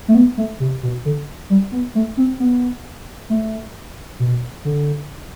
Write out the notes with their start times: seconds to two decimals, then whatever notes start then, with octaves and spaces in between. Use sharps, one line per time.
0.08 A3
0.15 B3
0.37 A3
0.60 C3
0.83 B2
1.05 D3
1.50 G3
1.72 B3
1.95 A3
2.17 C4
2.40 B3
3.30 A3
4.19 B2
4.65 D3